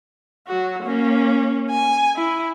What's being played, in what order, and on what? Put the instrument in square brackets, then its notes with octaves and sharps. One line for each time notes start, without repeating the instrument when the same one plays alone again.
[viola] F#3 F#4
A#3 C#4
G#5
E4